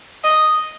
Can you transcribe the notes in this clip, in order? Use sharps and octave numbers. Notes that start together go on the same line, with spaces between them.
D#5